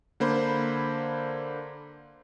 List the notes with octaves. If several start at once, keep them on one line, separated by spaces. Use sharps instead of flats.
D3 A#3 C5 B5